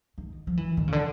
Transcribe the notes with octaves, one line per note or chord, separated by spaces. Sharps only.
D#3
F3
E3
D#3
C#3
D3